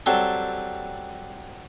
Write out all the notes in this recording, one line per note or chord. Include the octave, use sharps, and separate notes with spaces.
F#3 G3 C4 A4